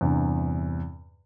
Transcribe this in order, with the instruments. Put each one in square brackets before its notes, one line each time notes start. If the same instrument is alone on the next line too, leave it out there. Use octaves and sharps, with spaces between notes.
[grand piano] E2 G2 C3